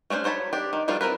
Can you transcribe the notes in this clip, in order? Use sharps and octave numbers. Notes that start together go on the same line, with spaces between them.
A3 C#4 D4 B4 C5
F#3 C5 C#5 A5 B5
D4 G4
D#3
D#3 F3 G3 D4 F4
C4 F4 A#4 B4